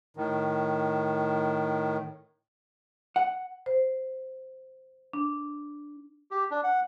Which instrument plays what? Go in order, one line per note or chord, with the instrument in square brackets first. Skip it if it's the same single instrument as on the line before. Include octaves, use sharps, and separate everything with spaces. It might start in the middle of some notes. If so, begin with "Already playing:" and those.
[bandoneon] A2 D#3
[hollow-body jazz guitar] F#5
[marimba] C5
D4
[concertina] G4
D4
F#5